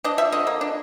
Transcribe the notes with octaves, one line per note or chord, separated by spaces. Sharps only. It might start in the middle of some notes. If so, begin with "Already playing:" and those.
D4 D#5
F3 E5
D3 D#5
A#3
D4